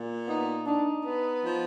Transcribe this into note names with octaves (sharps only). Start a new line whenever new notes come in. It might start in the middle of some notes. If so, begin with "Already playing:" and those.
Already playing: A#2
B3 D#4
D4 D#4
B3 B4
F3